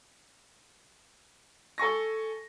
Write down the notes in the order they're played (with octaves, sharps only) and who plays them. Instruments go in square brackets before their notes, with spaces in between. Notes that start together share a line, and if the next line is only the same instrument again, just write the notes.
[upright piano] A4 G#5 C#6 A#6